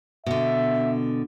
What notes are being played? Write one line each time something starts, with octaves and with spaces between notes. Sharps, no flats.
B2 D3 E5